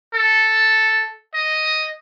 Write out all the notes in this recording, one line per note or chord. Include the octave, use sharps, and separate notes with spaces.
A4
D#5